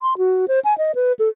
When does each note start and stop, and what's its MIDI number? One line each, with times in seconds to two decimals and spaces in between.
0.02 0.17 84
0.18 0.46 66
0.48 0.59 72
0.64 0.77 80
0.78 0.95 75
0.95 1.12 71
1.19 1.28 69